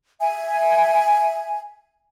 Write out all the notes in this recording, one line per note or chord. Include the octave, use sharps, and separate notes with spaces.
E5 G#5